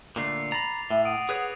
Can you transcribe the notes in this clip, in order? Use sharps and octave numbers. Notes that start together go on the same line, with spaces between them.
A#2 D3 A3 D6 C7
A#5 B5 A6 A#6 F7
A2 E5
F#5 D#6 D7 D#7
G#4 B4 C#5